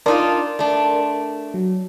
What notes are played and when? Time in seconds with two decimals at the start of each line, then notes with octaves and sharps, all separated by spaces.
0.06 D4 D#4 F4 A#4 D5 C6
0.59 A3 D4
1.54 F#3